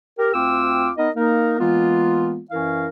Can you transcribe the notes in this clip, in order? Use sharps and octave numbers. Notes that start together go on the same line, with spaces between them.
G4 A#4
D2 C4 F4 G5 D6 E6
B3 D#4 A#4 D#5
A#3 D#4 A#4
E3 G#3 A#3 B3 F4
F#2 E3 C#4 E4 A#4 F5